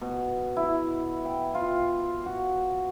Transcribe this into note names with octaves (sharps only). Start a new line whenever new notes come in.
B2
E4
G5
F4
F#4